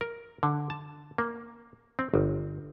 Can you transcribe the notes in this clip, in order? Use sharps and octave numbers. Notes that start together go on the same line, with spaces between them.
A#4
D3
A5
A#3
C4
G1